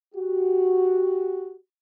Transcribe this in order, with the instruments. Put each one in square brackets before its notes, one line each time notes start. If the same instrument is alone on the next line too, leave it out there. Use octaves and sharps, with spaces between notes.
[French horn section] F#4 G4